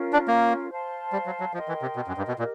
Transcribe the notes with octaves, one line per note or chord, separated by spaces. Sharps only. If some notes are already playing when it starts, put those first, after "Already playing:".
Already playing: C#4 F4 A#4
D4
A#3
C5 F5 A5 C6
G3
F#3
F#3
F3 A#4 D#5 G5 C6
E3
C3
B2
F#2
G2
B2
A#2 G4 A#4 D#5